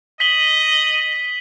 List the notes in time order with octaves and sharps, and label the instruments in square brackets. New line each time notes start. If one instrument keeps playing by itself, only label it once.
[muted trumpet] D#5 [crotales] B6 F#7 G7